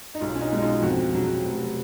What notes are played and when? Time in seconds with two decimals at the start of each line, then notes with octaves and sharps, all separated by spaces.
0.14 D#4
0.20 B1 F4
0.35 C#4
0.41 D#4
0.52 B2 G#3 D#4
0.62 F4
0.82 F2 F#4
1.14 C#3 F#3
1.44 F1